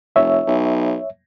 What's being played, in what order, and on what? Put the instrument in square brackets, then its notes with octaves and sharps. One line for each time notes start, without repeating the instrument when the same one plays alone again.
[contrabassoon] F1 [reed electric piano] C#5 E5
[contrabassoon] B1